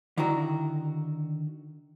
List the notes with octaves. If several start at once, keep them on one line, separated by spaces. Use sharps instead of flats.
D3 D#3 E4 F#4 A#5